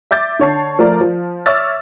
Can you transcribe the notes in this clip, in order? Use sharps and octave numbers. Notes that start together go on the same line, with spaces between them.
E5 D6 G6 A6
D3 C#5 A5 C7
F3 A3 A#4 D5
F3
C#5 E5 D6 E6 F6 A6